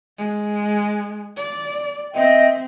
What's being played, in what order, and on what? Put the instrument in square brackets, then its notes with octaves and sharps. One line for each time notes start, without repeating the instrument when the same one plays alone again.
[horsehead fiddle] G#3
D5
[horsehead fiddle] C4 [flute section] D#5 E5 G5